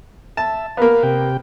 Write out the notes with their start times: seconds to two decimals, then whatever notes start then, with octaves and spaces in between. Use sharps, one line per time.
0.37 E5 A5
0.77 A#3 B3 A#4 F5
1.03 C3 G4 G5